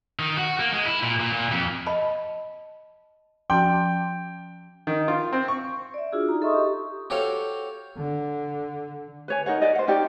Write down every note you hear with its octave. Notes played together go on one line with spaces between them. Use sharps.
D#3
F#4
A#3
G#3
E4
A#2
A#2
A#2
F2
D#5 A5 B5
F3 C#4 F#4 G5 C6 D6
D#3
F4
C4
C#6
D5 E5
D4 F4 F#4 G#4 E6
D#4 A#5
A4 D#5 E5 C6 C#6 D#6
G4
F#4 G4 A4 C5 C#5 F5
D3
B4 C#5 G#5
D#4 A#4 C#5 F#5
B4 C5 D5 D#5
C5 F#5
C#4 D#4 G4 D5